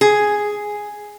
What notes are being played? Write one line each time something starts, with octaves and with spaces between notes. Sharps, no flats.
G#4